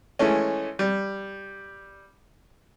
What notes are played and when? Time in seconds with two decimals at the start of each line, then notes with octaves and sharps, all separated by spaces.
0.19 E3 G#3 A3 C#4
0.79 G3